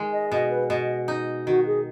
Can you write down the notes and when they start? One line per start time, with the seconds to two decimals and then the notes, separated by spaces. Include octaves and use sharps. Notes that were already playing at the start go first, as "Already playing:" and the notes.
Already playing: D#3 G#3
0.13 D#5
0.32 B2 D#5
0.51 B4
0.70 B2 D#5
1.08 D#4
1.47 D#3 F#4
1.66 G#4